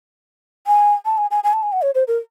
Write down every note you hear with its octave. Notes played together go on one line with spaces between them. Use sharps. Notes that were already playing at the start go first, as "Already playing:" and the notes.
G#5
A5
G#5
G#5
G#5
A5
G#5
F#5
C#5
C5
A#4